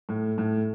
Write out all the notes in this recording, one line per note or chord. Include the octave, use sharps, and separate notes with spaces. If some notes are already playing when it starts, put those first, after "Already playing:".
A2
A2